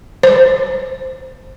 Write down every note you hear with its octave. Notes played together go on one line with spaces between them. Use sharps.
C5